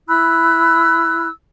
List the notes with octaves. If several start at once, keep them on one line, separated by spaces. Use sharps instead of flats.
E4 B5 E6 F#6